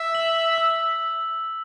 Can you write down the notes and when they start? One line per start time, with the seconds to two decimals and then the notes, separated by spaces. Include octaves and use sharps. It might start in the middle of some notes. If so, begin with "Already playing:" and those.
Already playing: E5
0.12 B6 F#7
0.58 E6